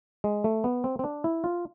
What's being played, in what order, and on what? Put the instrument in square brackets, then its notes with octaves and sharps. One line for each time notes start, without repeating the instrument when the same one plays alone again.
[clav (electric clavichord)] G#3
A3
B3
C4
C4
D4
E4
F4